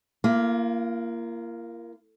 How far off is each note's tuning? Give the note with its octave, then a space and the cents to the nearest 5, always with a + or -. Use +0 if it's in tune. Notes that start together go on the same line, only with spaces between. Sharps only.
A#3 +0 F4 -45